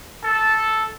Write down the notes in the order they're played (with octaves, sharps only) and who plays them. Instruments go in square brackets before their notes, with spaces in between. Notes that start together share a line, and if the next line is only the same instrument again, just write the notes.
[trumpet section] A4 A5